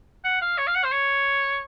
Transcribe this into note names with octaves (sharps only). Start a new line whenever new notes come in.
F#5
F5
C#5
F5
F#5
C5
C#5